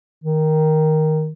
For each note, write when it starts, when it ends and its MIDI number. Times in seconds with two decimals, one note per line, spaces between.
0.24 1.31 51